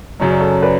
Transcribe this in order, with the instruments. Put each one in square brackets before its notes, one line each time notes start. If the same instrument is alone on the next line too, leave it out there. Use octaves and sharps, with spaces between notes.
[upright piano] F#2 C#3 F#3 [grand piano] C#5
[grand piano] D5
A4 C#5
B4 D5